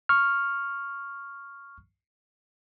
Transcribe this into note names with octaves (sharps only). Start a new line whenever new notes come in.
C#6 F6